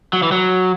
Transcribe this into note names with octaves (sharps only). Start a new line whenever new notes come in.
F#3
E3
F#3